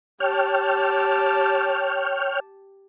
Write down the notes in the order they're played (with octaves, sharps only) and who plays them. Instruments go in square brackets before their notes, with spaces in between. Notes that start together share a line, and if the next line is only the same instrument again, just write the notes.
[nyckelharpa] G4 A5 [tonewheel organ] C#5 G5 F6